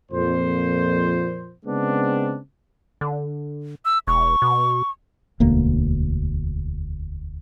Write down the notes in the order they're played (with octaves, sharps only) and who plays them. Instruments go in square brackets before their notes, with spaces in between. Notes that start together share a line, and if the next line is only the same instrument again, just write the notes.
[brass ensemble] F2 A#2 C5
C#3 G#3 B3 C4 D4
[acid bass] D3
[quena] E6
[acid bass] E1 [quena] C#6
[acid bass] B2
[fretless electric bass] E1 D2 A#3